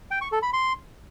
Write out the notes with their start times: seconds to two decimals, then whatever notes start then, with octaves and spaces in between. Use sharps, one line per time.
0.11 G5
0.21 C#6
0.32 A4
0.43 B5
0.53 C6